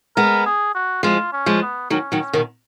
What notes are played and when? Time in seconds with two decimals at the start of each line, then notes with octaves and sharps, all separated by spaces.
0.16 G#3 B3 A#4
0.46 G#4
0.75 F#4
1.03 F3 G#3 F4
1.32 C#4
1.46 F3 G#3
1.62 B3
1.90 D#3 F#3 C#4
2.12 D#3 F#3
2.20 C#4
2.33 B2 D#3